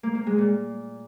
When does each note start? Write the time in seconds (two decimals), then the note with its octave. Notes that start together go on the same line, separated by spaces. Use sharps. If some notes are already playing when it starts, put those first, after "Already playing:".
0.03 A#3
0.15 A#3
0.27 G#3
0.38 A#2